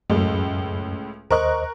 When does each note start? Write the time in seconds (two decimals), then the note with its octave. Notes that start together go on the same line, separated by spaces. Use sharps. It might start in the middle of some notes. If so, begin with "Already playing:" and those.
0.10 C#2 F#2 A2
1.31 D#2 A#4 C5 D#5 C#6 F#6